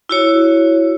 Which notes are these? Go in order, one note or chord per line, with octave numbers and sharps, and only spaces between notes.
E4 F#4 C#5